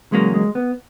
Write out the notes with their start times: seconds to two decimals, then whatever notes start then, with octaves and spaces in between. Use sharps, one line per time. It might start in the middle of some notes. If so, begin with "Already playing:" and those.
0.12 E2 C#3 F#3 G#3 A#3 C#4
0.34 G#3
0.55 B3